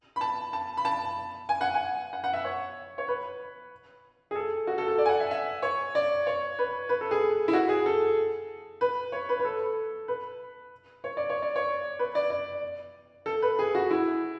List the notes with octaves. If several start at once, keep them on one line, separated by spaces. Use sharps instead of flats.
B5
A5
A5
B5
A5
G#5
F#5
G#5
F#5
F#5
E5
C#5
C#5
B4
G#4
A4
F#4
A4
A4
D5
G#5
F#5
E5
E5
C#5
D5
C#5
B4
B4
A4
G#4
E4
F#4
G#4
A4
B4
C#5
B4
B4
A4
B4
C#5
D5
C#5
D5
C#5
B4
D5
D5
A4
B4
G#4
F#4
E4